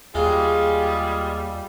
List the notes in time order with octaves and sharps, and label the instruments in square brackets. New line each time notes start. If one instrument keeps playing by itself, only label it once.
[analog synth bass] D#2 [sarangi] G3 [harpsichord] G#3 [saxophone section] F4 G#4